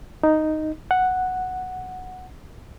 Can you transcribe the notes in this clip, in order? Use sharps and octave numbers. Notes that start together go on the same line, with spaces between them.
D#4
F#5